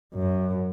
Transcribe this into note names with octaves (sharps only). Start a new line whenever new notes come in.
F#2